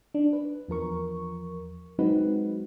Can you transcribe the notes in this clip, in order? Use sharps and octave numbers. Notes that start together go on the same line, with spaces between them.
D4
B4
E2 F3 A#4 C#6
F#3 G#3 C4 D#4 F#4 B4